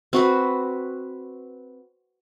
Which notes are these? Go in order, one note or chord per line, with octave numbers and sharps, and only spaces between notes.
C4 F#4 B4